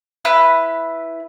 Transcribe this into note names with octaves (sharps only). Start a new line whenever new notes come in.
E4 B4 F#6